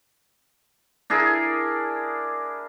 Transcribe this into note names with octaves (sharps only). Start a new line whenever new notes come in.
D4 E4 G#4 A#4